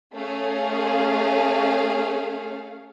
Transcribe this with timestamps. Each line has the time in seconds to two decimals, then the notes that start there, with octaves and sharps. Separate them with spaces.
0.13 A3 C#4 G#4 F5